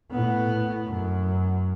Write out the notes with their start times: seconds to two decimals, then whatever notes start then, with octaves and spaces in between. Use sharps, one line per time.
0.11 A2 B3
0.86 F#2